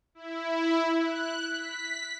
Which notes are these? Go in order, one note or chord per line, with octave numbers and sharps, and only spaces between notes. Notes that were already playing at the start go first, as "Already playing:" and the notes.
E4
F#6
B6